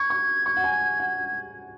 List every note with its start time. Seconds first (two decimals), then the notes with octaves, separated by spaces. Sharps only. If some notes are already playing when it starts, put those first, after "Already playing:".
Already playing: C#6 G#6
0.10 C#6
0.46 C#6
0.57 F#5
0.64 G#5
1.00 F#5